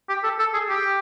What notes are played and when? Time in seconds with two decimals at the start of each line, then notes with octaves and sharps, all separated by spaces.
0.09 G4
0.24 A4
0.39 A4
0.54 G#4
0.69 G4